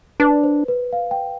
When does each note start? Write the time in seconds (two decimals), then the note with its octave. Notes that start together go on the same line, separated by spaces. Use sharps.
0.20 D4 B4
0.44 C5
0.68 B4
0.93 F5
1.11 G5